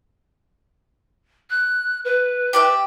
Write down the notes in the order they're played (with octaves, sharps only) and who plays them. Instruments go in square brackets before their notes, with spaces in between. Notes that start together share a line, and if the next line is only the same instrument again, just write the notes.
[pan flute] F#6
B4
[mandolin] G4 D5 E5